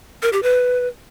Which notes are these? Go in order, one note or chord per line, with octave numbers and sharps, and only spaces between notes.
A#4
G4
B4